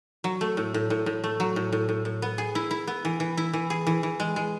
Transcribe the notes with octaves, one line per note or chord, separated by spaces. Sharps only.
F#3
A3
A2
A2
A2
A2
A3
F#3
A2
A2
A2
A2
B3
G#4
E4
E4
B3
E3
E3
E4
E3
G#4
E3
E3
G#3
G#3